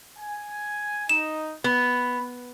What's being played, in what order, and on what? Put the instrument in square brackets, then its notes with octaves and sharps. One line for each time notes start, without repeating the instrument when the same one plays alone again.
[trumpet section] G#5
[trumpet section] D#4 [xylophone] E7
[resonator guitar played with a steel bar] B3 [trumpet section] B5